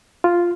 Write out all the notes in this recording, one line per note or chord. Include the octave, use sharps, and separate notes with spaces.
F4